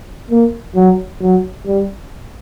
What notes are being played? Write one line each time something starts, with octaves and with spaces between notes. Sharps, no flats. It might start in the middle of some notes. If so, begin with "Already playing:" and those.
A#3
F#3
F#3
G3